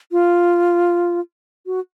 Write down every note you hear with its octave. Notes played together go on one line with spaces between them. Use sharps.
F4
F#4